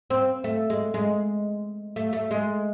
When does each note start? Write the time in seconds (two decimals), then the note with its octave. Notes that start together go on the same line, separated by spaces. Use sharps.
0.10 C4
0.44 A3
0.70 G#3
0.94 G#3
1.96 A3
2.13 A3
2.31 G#3